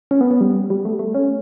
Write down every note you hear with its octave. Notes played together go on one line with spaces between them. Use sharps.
C#4
B3
B3
G3
G3
A3
A3
C#4